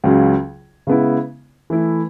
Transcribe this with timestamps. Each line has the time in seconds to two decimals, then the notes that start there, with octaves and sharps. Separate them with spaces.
0.04 C#2 C#3 F#3
0.87 C#3 G#3 B3 E4
1.70 E3 A3 E4